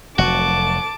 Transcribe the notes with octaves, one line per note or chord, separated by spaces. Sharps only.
F1 F#3 F#4 A5 D6